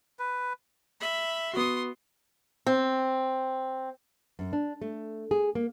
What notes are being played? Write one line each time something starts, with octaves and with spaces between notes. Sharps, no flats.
B4
E5 B5
B3 F#4 C6 D#6
C4
F#2
D4
A3
G#4
A#3